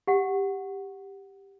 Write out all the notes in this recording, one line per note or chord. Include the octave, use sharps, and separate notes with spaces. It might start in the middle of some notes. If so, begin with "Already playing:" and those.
G4 F#5